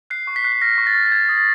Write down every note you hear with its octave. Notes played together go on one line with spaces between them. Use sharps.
F#6 C7
C#6
B6
F#6 C7
B6
F6 A#6
C#6
A6
F6
A6
F#6 G#6
D#6
A6